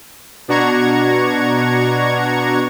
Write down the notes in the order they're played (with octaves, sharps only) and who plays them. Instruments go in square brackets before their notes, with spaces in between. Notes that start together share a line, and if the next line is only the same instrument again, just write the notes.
[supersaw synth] B2 D4 F#4 A#5 C#6 G#6